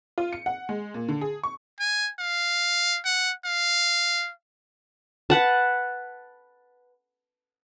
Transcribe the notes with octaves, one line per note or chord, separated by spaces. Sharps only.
F4
C#7
F#5
G#3
A#2
D3
G#4
C#6
G#5
F5
F#5
F5
B4 F#5 A5